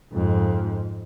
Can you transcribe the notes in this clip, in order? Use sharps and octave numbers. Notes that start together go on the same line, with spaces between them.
F2 G#2